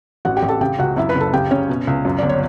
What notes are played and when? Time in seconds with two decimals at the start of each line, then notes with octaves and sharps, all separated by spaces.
0.25 A1 F#4 F#5
0.36 G4 G5
0.43 A1
0.48 A4 A5
0.61 C#3 G4 G5
0.79 C#2 F#4 F#5
0.96 F#2 E4 E5
1.09 B4 B5
1.15 F#1
1.21 A4 A5
1.33 C#3 G4 G5
1.51 C#3 C#4 C#5
1.69 B2
1.87 C#2
2.05 F#2
2.18 G1 D5
2.29 C#5